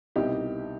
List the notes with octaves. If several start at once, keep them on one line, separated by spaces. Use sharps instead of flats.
C2 B2 G3 D#4 G4